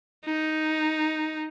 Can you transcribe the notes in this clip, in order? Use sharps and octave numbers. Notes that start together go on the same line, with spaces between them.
D#4